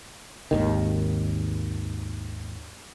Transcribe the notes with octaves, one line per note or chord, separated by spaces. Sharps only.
G#1 D#2 D#3